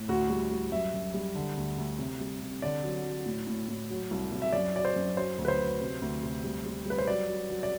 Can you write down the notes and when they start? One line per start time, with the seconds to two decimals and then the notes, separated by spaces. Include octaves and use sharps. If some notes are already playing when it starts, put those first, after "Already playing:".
Already playing: A2
0.08 D2 F#4
0.30 G3
0.51 G3
0.72 F#2 E5
0.94 F#2
1.14 G3
1.35 D3
1.57 D2
1.78 D2
1.99 C3
2.20 G3
2.42 C3
2.62 D3 D5
2.84 F#3
3.05 F#3
3.26 A2
3.47 A2
3.68 A2
3.90 F#3
4.11 C2
4.32 C2
4.42 E5
4.53 F#2 D5
4.74 F#3 D5
4.85 C5
4.96 F#2
5.17 F#3 C5
5.38 D2
5.45 B4
5.48 C5
5.59 F#3
5.80 C3
6.02 D2
6.23 C3
6.44 G3
6.65 G3
6.85 G3 B4
6.98 C5
7.07 F#3 D5
7.29 F#3
7.50 F#3
7.63 D5